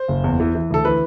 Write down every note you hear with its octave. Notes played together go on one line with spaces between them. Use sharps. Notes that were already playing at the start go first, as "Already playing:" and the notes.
Already playing: C5
F#1
E2
E3
E3
D2 A4
E3 B4